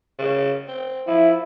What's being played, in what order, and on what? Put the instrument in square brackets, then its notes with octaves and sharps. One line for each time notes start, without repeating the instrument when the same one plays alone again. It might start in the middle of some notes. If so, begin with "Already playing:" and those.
[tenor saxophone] C#3
C4
[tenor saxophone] F3 [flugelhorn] E4